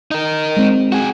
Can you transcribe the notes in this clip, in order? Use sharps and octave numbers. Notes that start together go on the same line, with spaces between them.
D#4 A#4
G#3 C4
F#4 G#4